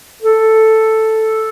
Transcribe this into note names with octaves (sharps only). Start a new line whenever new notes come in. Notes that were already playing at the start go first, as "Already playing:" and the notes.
A4